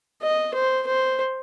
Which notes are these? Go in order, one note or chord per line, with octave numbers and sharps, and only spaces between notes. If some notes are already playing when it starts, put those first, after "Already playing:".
D#5
C5
C5